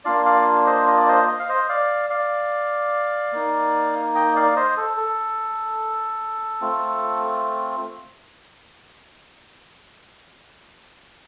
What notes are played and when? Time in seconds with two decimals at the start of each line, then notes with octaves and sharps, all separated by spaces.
0.05 A#3 D4 F4 D5 F5
0.25 D5 F5
0.66 C5 D#5
0.87 D#5
0.98 D5
1.08 C5 D#5
1.28 D#5
1.39 F5
1.49 C5 D#5
1.69 D5 F5
2.10 D5 F5
3.32 A#3 D#4
4.15 D#5 G5
4.36 D5 F5
4.56 C5 D#5
4.77 A4
4.97 A4
6.61 A3 C4 F4